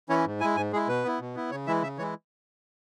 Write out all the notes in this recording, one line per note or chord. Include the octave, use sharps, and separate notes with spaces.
E3 C#4 E4 C#5
G#2
G#3 E4 G#5
G#2 G#5
G#3 E4 G#4
B2 B4
B3 E4
B2
B3 E4
C#3 C#5
E3 G#3 E4 E5
C#3 E5
E3 G#3 E4 C#5